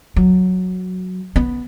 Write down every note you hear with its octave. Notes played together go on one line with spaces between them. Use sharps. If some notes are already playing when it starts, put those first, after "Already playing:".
F#3
B3